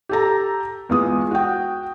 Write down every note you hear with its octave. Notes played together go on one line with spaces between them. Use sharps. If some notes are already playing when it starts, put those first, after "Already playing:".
G4 A4 A#5
E2 G#3 F4 D#6
F#4 G5